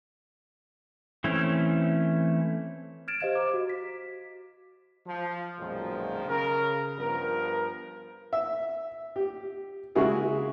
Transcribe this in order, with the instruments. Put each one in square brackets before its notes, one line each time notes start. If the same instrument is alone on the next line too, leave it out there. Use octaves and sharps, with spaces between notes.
[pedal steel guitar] E3 A3 C4 C#4 E4
[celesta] F6 G#6 A6 D7 E7
G4 C5 D#5 F5 G#6 E7
C5 A#5 D6
F#4
B6
[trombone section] F3
B1 F#2 A#2 D#3 F3 G#3
C#3 A#4
G2 F3 B3 A#4
[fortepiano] E5
G4
C#3 G#3 E4 F#4 G#4 A#4